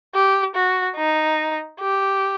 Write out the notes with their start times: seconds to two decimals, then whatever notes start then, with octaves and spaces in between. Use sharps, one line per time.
0.15 G4
0.55 F#4
0.96 D#4
1.80 G4